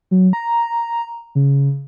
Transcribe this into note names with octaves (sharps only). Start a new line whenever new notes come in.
F#3
A#5
C#3